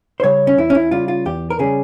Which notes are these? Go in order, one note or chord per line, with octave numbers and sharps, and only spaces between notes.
C5
C#3 G3 C#5
C#4
E2 E4
C#4
E4
C#3 G3 F4
F4
E2 G4
A#4
C#3 G3 G#4